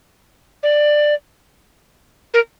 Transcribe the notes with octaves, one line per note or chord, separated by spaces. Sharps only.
D5
A#4